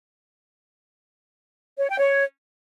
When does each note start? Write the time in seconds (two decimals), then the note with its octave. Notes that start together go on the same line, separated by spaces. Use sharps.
1.79 C#5
1.89 G5
1.99 C#5